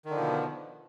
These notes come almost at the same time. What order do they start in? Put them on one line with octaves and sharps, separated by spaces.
D#3 D3 F3 B2